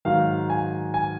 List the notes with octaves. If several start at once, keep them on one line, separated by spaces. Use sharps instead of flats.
G#2 D#3 F#3 F5
G#5
G#5